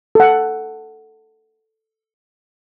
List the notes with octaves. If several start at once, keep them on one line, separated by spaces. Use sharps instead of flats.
A4 F#5